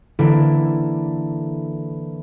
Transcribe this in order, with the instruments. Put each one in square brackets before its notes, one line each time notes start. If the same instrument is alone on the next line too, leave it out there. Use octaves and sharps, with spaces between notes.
[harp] D3 E3 A#3 C4 D4 E4